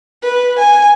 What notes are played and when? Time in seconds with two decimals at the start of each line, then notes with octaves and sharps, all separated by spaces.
0.23 B4
0.59 G#5